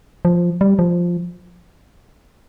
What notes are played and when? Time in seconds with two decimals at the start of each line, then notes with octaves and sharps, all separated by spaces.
0.25 F3
0.61 G3
0.79 F3